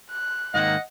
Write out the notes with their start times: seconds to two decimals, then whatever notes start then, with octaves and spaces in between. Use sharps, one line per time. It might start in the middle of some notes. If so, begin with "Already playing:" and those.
0.11 F#6
0.54 G#2 D#3 A#3 D#5 F#5